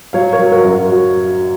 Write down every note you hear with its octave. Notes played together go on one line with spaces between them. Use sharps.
F#3 C#5 F5
A#4 C#5
F#3
F#4 A#4
F#2
F#4 A#4
F#3 F#4